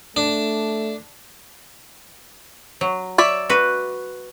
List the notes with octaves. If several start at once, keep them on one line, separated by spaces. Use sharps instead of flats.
A3 D4
F#3
C#5 D5 E5
F#4 B4